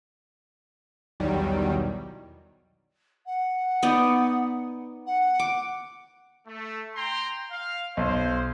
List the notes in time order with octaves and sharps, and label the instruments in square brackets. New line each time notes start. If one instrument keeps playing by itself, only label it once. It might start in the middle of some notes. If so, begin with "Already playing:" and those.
[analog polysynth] B1 E2 D#3 F#3 G3
[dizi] F#5
[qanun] B3 D#4 D5
[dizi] F#5
[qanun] D6
[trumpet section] A3
G5 A#5 C6
F5
[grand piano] B1 [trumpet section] C5